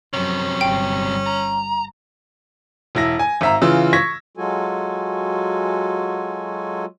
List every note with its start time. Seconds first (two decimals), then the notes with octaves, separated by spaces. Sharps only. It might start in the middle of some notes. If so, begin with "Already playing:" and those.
0.14 F#2 C3 F3 F#3 C#4
0.61 G1 G3 G5
1.26 A#5
2.95 E1 E4 A#6
3.19 G#5
3.41 G#1 E5 A#5
3.62 C#3 E3 F4 E6
3.93 C#6 G#6 A#6 B6
4.37 F#3 G#3 F4 F#4 A4 G#5